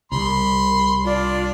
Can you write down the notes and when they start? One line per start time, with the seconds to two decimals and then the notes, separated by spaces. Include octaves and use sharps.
0.12 C2 B5 C6
1.03 D4 F4 D5